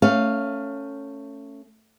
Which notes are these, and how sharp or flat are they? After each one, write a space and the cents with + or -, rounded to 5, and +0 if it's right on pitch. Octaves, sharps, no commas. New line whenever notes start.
A3 +20 C#4 +0 F5 +0